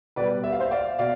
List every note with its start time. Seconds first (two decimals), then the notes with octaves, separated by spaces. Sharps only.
0.16 B2 G3 B4 D5
0.44 E5
0.52 F5
0.60 C5 E5
0.71 D5 F5
0.99 B2 D5 F5